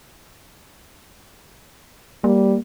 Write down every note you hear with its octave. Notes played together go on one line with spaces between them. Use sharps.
G3 A#3